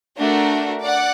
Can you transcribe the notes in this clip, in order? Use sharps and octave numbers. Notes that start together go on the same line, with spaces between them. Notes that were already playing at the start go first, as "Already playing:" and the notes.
A3 D4 F#4 A#4
D5 F#5